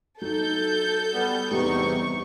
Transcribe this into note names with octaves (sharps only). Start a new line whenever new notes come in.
F#3 D#4 A4 G6
G3 B3
E2 C3 G3 B3 D#4 C#6